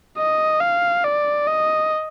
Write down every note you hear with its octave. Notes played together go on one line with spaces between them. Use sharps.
D#5
F5
D5
D#5